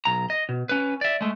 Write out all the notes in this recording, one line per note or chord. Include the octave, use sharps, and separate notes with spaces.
B1 A#5
D#5
B2
C#4 B4
D5 E5
G#3 A3